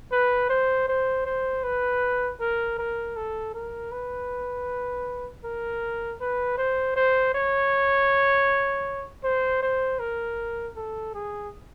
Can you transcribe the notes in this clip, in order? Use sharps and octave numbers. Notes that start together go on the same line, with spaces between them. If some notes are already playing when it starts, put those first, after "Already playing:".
B4
C5
C5
C5
B4
A#4
A#4
A4
A#4
B4
A#4
B4
C5
C5
C#5
C5
C5
A#4
A4
G#4